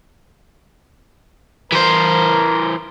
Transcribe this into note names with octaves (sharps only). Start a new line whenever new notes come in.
E3 A#4 C5